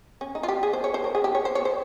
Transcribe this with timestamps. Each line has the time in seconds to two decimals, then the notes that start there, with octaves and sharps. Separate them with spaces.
0.21 C#4
0.35 D#4
0.43 F4
0.48 G4
0.63 G#4
0.73 C5
0.84 C#5
0.94 C5
1.04 A#4
1.15 G#4
1.24 G4
1.35 C#5
1.45 C5
1.55 C#5
1.65 C5